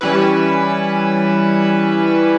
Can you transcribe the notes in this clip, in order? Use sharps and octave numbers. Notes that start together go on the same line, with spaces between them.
E3 G3 C#4 E4 B4